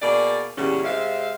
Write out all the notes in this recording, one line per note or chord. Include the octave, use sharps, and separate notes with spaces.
B2 A#3 G#4 D5
E2 A#2 C#3 G3 C#4
C3 G#3 C4 E5 F5